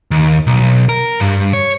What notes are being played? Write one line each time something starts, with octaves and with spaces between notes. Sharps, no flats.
D#2
B1
A#4
G2
C#5